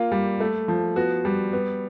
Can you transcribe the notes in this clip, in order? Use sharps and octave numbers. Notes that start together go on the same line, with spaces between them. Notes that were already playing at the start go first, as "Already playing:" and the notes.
Already playing: A#3 F4
G3
A3
F3
B3 F#4
G3
B3